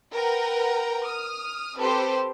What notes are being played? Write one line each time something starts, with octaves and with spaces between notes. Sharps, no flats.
A#4 B4 F#5 G5 A#5
D#6 F6
C4 G4 A4 B4 C5